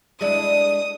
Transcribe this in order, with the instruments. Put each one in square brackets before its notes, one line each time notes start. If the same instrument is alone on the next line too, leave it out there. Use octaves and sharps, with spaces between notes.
[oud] G#3 D4 E4 [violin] D#6